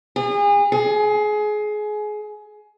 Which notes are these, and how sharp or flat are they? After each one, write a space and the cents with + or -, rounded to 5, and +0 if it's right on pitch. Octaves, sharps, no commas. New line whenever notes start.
G#4 -35
G#4 +25